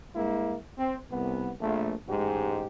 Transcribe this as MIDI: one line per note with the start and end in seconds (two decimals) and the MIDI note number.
0.15 0.56 43
0.15 0.56 56
0.15 0.56 58
0.15 0.56 64
0.77 0.97 60
1.10 1.50 36
1.10 1.50 59
1.60 1.94 34
1.60 1.94 57
2.07 2.66 33
2.07 2.66 44
2.07 2.66 56
2.07 2.66 67